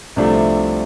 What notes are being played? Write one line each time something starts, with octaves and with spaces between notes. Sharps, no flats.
C2 C3 F3 A3 D4